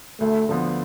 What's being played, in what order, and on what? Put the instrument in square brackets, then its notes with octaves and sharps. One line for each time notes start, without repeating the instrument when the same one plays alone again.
[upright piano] D2 [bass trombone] A3
[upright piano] D3 F3 B3